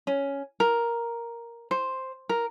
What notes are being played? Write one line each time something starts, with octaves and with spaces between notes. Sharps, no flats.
C#4
A#4
C5
A#4